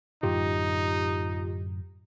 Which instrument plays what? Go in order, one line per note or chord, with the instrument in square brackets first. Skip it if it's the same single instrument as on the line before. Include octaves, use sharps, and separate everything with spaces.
[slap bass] F#2 A2 D3 [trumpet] D#4 [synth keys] F4 G4